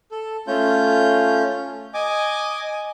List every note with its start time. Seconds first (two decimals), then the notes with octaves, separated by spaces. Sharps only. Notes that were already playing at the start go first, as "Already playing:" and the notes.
0.11 A4
0.47 A3 C#4 F4 G6
1.94 D#5 G#5 D6